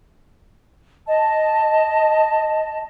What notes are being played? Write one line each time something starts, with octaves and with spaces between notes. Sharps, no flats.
D#5 A5